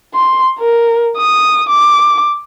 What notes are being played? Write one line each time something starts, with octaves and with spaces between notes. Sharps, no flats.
C6
A#4
D#6
D6